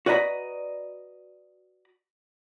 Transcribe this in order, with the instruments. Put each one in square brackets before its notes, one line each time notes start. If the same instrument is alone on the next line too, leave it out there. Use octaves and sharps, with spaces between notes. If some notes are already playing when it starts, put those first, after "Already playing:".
[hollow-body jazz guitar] F#4 B4 D5 D#5 A#5 B5